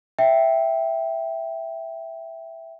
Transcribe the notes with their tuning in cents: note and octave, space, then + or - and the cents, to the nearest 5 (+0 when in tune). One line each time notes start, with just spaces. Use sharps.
E5 +0 G5 +0